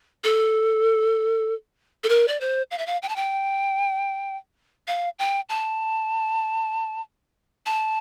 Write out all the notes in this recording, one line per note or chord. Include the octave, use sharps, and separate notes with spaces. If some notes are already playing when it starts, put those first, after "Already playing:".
A4
A4
A#4
D5
C5
F5
E5
F5
G5
A5
G5
F5
G5
A5
A5